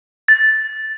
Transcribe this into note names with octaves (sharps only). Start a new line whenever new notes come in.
A6